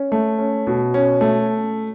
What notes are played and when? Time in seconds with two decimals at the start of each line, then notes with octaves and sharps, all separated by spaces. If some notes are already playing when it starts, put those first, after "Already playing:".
Already playing: C#4
0.12 A3
0.39 C#4
0.67 B2
0.94 C#4
1.21 A3